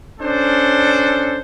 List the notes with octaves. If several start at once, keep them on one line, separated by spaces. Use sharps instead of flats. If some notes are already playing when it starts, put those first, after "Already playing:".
C#4 D4 A4 C5